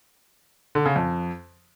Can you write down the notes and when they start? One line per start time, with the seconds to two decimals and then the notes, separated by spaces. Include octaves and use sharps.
0.75 D3
0.86 C#3
0.96 F2